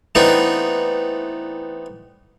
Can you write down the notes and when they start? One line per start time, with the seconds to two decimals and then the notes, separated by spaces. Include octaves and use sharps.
0.15 E3 A3 B3 C4 D4 D#4